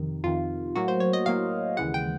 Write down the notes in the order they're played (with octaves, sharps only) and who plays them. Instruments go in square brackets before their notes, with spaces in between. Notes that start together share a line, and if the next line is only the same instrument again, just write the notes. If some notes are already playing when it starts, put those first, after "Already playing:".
Already playing: [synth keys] F2 C3 D#3
F2 C3 D#3 F4
A2 F#3 A#3 F#4
C5
C#5
D#5
A2 F#3 A#3 F5
D#2 C#3 E3 G#3 F#5
G5